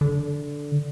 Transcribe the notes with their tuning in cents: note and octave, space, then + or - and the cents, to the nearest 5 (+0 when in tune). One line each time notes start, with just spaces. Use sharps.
D3 -10